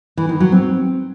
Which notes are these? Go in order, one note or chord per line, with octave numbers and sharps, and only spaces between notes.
E3
D#3
F#3
C4